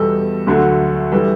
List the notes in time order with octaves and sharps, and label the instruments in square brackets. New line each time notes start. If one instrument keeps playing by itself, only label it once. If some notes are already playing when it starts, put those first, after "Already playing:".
Already playing: [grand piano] E2 B2 G3 A4
D2 D3 F#3 A3
E3 G3 A4